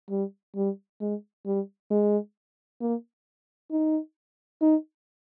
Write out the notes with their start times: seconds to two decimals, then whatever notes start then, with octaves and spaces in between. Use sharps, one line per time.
0.10 G3
0.56 G3
1.01 G#3
1.46 G3
1.90 G#3
2.81 A#3
3.71 D#4
4.62 D#4